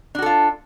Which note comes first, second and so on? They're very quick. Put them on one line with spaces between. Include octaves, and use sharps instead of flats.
D4 F#4 A4 F4